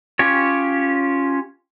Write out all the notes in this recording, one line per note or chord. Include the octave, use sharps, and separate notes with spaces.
C#4 F4 G4 C#5